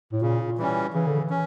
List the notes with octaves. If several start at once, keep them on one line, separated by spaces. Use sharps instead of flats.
A2
A#2 C#3
A#2
E3 G3 C#4
C#3 E3
D3
E3
C#4